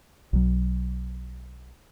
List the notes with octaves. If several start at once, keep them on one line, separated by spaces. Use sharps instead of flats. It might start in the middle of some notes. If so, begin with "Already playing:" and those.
B1 F#3